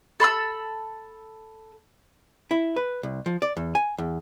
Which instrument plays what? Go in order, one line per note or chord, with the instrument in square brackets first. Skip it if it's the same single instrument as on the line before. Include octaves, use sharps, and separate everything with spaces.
[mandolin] A4 B5 C6 E6
[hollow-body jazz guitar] E4
B4
C2
F3
D5
E2
G#5
E2